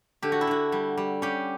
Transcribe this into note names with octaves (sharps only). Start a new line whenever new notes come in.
D3 G4
F#4
E4
D3 F#4
G3
G3
C#4 G4